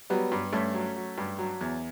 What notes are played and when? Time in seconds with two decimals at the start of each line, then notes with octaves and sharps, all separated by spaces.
0.10 F#3 G3 B3
0.32 G2
0.52 G2 A3 C#4
0.74 F#3
0.96 F#3
1.18 G2
1.38 F#3
1.61 E2